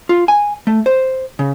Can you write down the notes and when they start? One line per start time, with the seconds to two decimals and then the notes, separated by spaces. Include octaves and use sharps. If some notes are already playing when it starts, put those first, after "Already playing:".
0.09 F4
0.28 G#5
0.67 A3
0.86 C5
1.39 C#3